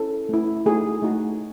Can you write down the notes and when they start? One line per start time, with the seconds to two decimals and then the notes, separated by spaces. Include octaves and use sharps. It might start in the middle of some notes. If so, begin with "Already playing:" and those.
Already playing: C#4 E4 A4
0.29 A3 C#4 E4
0.66 A3 D#4 F#4 G#4
1.02 A3 D#4 F#4